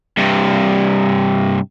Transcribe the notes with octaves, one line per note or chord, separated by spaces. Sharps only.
G2 C3